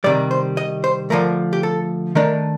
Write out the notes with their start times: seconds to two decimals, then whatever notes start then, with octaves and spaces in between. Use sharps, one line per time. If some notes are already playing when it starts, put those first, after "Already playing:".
0.04 C3 D#3 G3 D5
0.31 C5
0.57 D#5
0.84 C5
1.10 D3 F3 A3 A#4
1.53 G4
1.63 A4
2.15 D#3 A3 D4 A#4